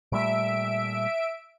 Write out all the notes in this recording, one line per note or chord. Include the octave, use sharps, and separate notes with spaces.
A#2 G3 A3 E5 D7